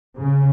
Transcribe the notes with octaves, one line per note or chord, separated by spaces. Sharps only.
C#3